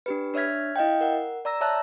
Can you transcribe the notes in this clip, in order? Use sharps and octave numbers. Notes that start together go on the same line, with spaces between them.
D4 G4 B4
D4 C#5 E5 F6 G#6 B6
E4 D#5 F5 G5
A#4 F#5
D5 A#5 E6 A#6
C#5 D5 E5 A5 E6 F#6